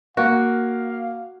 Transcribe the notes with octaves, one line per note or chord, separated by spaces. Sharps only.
A#3 F#4 F5